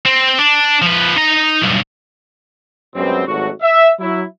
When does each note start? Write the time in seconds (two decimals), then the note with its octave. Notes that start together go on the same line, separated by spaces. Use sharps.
0.06 C4
0.38 D4
0.82 F3 B4
1.17 D#4 A#5
1.62 B1 G2
2.95 F#2 B2 G3 G#3 B3 C4
3.27 G#1 D#2 B2 F#3 A3 F#4
3.62 E5
4.00 F#3 E4